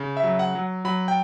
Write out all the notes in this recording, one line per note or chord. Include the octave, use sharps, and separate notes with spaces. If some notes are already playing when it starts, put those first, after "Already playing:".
Already playing: C#3
E5
F#3
F#5
F#3
F#3 B5
G5